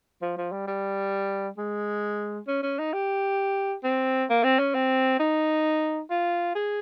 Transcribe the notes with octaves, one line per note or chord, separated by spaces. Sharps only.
F3
F3
G3
G3
G#3
C#4
C#4
D#4
G4
C4
A#3
C4
C#4
C4
D#4
F4
G#4